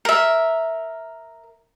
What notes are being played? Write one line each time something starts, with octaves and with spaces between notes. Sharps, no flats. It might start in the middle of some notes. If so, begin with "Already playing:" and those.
A#4 E5